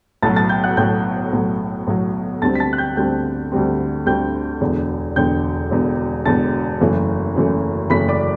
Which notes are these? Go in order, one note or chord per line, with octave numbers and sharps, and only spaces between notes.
B1 A2 F#3 A5 A6
A5 A6
G5 G6
F#5 F#6
B1 A2 F#3 G5 G6
B1 A2 F#3
B1 A2 F#3
D2 D3 G3 C4 A5 A6
B6
A5 A6
F#6
G5 G6
D2 D3 G3 C4 G5 G6
D2 D3 G3 C4
D2 D3 G3 C4 G5 G6
E1 E2 D3
E1 E2 D3 G5 G6
E1 E2 D3
E1 E2 D3 A5 A6
F#1 F#2 E3 A3
F#1 F#2 E3 A3
F#1 F#2 E3 A3 B5 B6
D5 D6